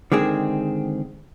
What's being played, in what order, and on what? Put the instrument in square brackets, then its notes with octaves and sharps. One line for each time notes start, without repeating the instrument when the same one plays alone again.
[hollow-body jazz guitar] D3 D#3 G#3 C4 G#4